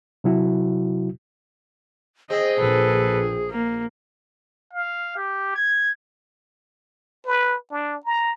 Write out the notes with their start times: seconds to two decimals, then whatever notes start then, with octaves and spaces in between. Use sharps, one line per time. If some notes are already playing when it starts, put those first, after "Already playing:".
0.24 C3 F#3 E4 F#4
2.30 C4 G#4 D#5
2.59 A#1 A4 B4
3.51 A#3
4.73 F5
5.17 G4
5.55 G#6
7.26 B4
7.71 D4
8.05 A#5